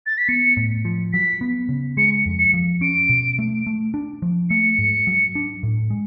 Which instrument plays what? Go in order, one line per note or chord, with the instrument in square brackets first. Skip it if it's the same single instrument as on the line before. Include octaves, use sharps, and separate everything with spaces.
[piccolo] A6
B6
[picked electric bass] B3 [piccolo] C#7
[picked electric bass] A2
F3
[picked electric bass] F#3 [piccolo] B6
[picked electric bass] B3
C#3
[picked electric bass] G#3 [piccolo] C#7
[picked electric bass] F2
[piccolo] C#7
[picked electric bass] F3
[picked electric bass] C#4 [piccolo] D7
[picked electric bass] B2
A3
A3
D4
F3
[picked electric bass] A3 [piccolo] C#7
[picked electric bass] G#2
F#3
D4
A2
G#3